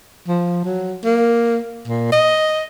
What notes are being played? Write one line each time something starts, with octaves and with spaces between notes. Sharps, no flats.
F3
F#3
A#3
A#2
D#5